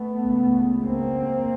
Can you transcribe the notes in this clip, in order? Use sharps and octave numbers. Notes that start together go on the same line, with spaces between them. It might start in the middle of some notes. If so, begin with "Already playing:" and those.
Already playing: A3 B3
C#2 C#3
A#3 C4